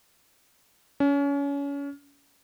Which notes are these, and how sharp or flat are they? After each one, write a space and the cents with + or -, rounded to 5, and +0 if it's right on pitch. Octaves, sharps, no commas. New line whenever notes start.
C#4 +30